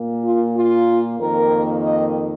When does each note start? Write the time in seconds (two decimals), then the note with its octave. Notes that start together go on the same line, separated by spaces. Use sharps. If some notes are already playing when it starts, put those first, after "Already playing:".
Already playing: A#2 A#3
0.22 F4
0.55 F4
1.19 F2 D#3 A#3 A#4
1.84 D#5